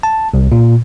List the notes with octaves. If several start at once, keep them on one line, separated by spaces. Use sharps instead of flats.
A5
C2
A#2